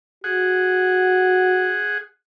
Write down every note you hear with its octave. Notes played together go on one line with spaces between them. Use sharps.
F#4 G#4 F#5